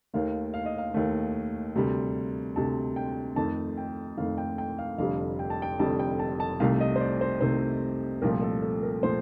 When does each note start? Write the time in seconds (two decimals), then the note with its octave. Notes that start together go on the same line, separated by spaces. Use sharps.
0.14 D#2 D#3 A3 F5
0.54 F5
0.66 D#5
0.78 F5
0.94 D#2 D#3 A3
1.75 D2 C3 G3
2.56 D2 C3 G3 A5
2.96 G5
3.36 F2 D#3 A3 A5
3.77 G5
4.17 F2 D#3 A3 F5
4.38 G5
4.58 G5
4.79 F5
4.98 F1 F2 D3 G3 F5
5.39 G5
5.50 A5
5.62 G5
5.80 F1 F2 D3 G3 A5
5.99 G5
6.19 A5
6.40 A5
6.60 C2 C3 D#3 A3 F5
6.80 D#5
6.96 C5
7.00 D5
7.21 C5
7.41 C2 C3 D#3 A3 C5
8.22 C2 A#2 F3 A3 A#4
8.42 A4
8.62 A4
8.82 A#4
9.03 A#2 F3 A3 C5